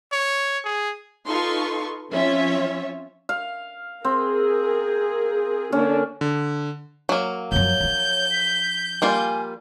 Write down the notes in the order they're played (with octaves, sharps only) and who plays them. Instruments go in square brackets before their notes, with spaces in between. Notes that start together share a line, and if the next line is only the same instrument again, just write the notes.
[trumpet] C#5
G#4
[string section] D#4 F4 A4 B4 C6 C#6
F3 C4 C#4 F4 C#5 E5
[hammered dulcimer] F5
[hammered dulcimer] C4 [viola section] G#4 A#4
[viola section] D3 A#3 D4 [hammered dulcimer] C#4
[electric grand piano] D3
[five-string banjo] F#3 A#3
[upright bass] F#2 F3 [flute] C#5 [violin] G6
[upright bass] F3 D4
[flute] B6
[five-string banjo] G3 A#3 F4 [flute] G#5